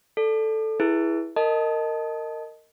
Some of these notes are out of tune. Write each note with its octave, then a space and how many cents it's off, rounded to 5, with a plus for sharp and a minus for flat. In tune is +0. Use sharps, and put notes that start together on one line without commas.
A4 +0 D5 +0
E4 +0 G#4 +0 B4 -25
A#4 -20 D#5 +0 A5 +0